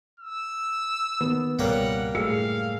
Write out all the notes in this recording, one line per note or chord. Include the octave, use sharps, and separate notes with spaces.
E6
D#3 B3
C#2 G#2 B2 G3 A#3 C#5 F#5
F#1 A2 G#4 F5 E6 C#7